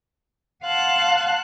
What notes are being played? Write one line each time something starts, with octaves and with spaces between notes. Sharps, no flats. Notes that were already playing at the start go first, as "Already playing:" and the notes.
F5 F#5 A5 C6 F#6